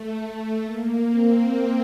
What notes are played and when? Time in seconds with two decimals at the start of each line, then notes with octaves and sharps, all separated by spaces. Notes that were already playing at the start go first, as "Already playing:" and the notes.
Already playing: A3
0.62 A#3
1.10 C4